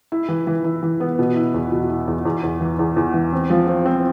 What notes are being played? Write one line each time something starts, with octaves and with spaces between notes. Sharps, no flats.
E4
E3
E3
E4
E3
B3
B2
E4
E2
B2
E4
E2
E2
E2
E3
E2
E2
E3
C4
F3
C4
C4